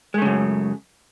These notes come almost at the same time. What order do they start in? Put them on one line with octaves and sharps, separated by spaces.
G#3 A3 C#3 F#2